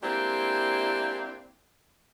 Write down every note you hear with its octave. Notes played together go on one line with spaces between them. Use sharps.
G#3 A#3 C4 D4 E4 G4